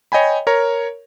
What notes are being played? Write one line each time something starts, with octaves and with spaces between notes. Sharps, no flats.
C#5 D#5 G5 G#5 B5
A#4 C#5 A#5